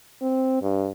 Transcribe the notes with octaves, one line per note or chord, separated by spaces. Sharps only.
C4
G2